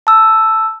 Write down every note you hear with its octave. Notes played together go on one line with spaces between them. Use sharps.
A5 E6